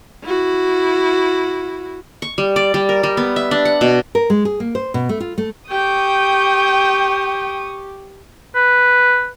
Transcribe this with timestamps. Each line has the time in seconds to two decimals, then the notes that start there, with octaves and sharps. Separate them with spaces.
0.24 E4 F#4
2.22 C#6
2.38 G3
2.56 D5
2.74 G3
2.89 A#4
3.03 G3
3.17 B3
3.36 E5
3.51 D4
3.65 F#5
3.81 B2
4.15 A#4
4.30 G#3
4.45 G#4
4.60 A#3
4.75 C5
4.94 B2
5.09 A3
5.20 F4
5.38 A3
5.70 G4 G5 C#6 D#6
8.55 B4